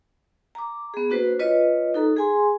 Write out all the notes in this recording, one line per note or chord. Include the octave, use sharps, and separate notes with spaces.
A#5 D6
B3 G#4
A#3 D4 F#4 B4 C5
F4 B4 C#5 D#5
D#4 A4 A#5
G#4 G#5 C6